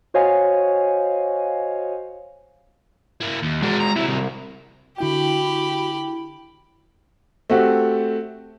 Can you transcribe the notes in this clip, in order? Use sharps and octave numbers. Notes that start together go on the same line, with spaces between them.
F#4 C5 C#5 D#5 F5 G#5
A#3 E4
D#2
G#3 D4 F#4 A#4
A#5
C3 F#3 E4
C2
D3 E4 F#4 G4 G5 B5
A3 C4 F#4 G4